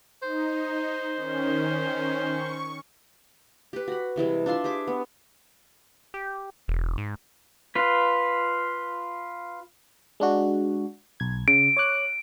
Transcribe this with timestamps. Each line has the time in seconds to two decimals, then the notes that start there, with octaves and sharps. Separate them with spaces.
0.23 D#4 C5
1.16 D#3 C#4
2.21 C#6
3.73 G4 B4
3.88 F#4 B5
4.16 C3 E3 G3 G#3
4.46 D4 F4 E5 C6
4.64 G4 G#4 E5 D6
4.87 B3
6.14 G4
6.68 E1
6.98 G#2
7.75 F4 B4
10.20 G#3 D4 F#4
11.20 B1 G#6
11.48 C#3 D7
11.77 C#5 D6 F#6